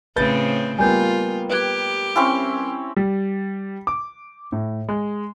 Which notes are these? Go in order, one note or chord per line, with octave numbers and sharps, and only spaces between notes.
A2 C#3 C4 B4 G6 A6
G3 A#3 B3 F4 G#5 G6
G4 B4 F#6 G#6
C4 C#4 E4
G3
D6
A2
G#3